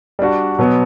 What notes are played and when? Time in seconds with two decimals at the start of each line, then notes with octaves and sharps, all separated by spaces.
0.19 G3 D4 F#4
0.59 B2 F#3 B3